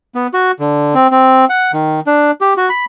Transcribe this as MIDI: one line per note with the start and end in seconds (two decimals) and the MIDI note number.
0.15 0.27 59
0.34 0.52 66
0.60 0.94 50
0.95 1.07 60
1.11 1.45 60
1.50 1.72 78
1.73 2.00 51
2.07 2.31 62
2.41 2.54 67
2.57 2.69 66
2.69 2.85 83